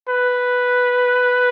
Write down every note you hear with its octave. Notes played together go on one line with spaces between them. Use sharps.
B4